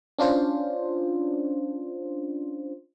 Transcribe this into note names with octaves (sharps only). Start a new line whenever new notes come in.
C#4 D4 F4 C5